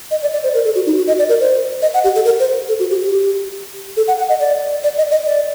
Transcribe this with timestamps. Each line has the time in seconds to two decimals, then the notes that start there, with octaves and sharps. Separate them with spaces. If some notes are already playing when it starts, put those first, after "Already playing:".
0.11 D#5
0.22 D5
0.33 D5
0.43 C5
0.54 A#4
0.65 A4
0.75 F#4
0.87 D#4
0.97 F#4
1.07 D#5
1.19 D5
1.29 A#4
1.40 C5
1.82 D#5
1.94 F#5
2.04 G4
2.15 A4
2.25 A#4
2.40 C5
2.68 A4
2.79 F#4
2.90 G4
3.01 G4
3.97 A4
4.08 F#5
4.18 F#5
4.29 D#5
4.40 D5
4.83 D5
4.97 D#5
5.12 D#5
5.26 D5